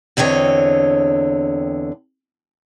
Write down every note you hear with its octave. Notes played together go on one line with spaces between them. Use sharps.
E2 D3 C4 C#5 D#5